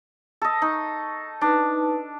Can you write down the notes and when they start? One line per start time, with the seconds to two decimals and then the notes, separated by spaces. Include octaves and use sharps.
0.42 A4 D#5
0.62 D#4 C#6
1.41 D4 D#4 B4